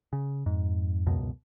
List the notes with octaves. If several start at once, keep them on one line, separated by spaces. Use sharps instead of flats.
C#3
F2 G#2
C#2 F#2 B2